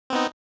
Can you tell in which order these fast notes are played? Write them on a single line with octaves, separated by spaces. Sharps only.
C4 B3 D#4